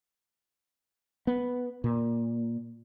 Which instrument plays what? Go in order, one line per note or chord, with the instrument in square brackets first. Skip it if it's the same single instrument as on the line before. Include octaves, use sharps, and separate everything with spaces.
[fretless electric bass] B3
A#2